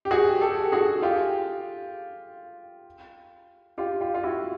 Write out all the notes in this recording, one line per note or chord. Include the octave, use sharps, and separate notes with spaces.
G4
F#4 G#4
G4 A4
F#4 G#4
F4 G4
F4 G4
F4 G4
F4
E4 F#4